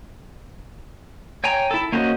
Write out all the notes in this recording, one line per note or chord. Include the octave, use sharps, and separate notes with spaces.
C#5 G5 G#5 A#5
E4 A4
A#3 C#4 F#4 C5 D#5